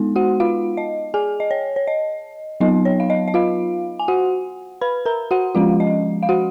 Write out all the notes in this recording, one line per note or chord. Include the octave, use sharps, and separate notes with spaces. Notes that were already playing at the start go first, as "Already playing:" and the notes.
Already playing: G#3 B3 D#4
F#4 F#5
F4 F5
D#5
G#4 G#5
D#5
C#5
C#5
D#5
F#3 B3 D#4 D#5
C#5
F5
D#5
D#5
F4 F5
G#5
F#4 F#5
B4 B5
A#4 A#5
F#4 F#5
F3 G#3 C#4 F4 F5
D#5
F5
F#4 F#5